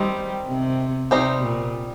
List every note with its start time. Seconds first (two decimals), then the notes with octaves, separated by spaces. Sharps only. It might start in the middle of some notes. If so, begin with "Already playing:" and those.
Already playing: D#3 G3 C4 D#4
0.49 C3
1.11 C3 G3 C4 D#4 G4 D#5
1.43 A#2